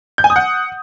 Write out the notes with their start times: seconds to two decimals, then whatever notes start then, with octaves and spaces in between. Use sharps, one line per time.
0.18 G6
0.24 G#5
0.30 D#6
0.36 F#5